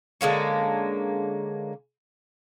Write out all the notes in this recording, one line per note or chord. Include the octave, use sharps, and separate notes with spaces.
D3 G#3 A#3 C#4